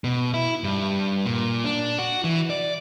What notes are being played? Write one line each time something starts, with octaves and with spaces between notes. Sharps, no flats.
B2
E4
G2
A#2
D4
F#4
E3
D5